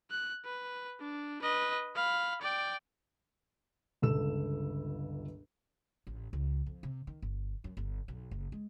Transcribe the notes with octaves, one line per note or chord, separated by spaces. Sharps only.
F#6
B4
D4
B4 D#5
F5 B5
D5 G5
G1 C#2 A4 E6 E7
A1
C#2
F2
C3
D#3
G1
F#2
G1
B1
F#1
G#3